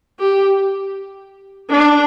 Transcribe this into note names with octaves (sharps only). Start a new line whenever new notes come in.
G4
D4